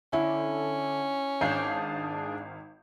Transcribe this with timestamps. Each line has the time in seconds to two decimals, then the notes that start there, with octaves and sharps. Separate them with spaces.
0.13 D3 C#4 E4
1.41 G#1 D4 G#4 F5 G6